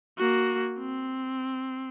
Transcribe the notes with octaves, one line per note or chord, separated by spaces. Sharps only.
A#3 F#4
C4